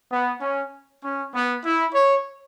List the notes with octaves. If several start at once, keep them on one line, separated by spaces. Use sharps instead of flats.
B3
C#4
C#4
B3
E4
C#5